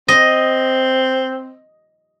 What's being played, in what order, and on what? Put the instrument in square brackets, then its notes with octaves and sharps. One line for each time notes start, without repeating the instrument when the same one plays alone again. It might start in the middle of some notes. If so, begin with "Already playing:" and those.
[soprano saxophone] C4 [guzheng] D#5